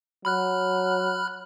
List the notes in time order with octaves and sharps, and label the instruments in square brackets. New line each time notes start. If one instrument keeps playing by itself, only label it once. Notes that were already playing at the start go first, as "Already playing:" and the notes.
[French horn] F#3 [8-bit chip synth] B5 F6 F#6